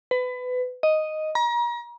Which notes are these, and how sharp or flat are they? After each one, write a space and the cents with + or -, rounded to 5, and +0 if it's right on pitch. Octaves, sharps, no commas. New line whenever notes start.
B4 +25
D#5 +0
A#5 +35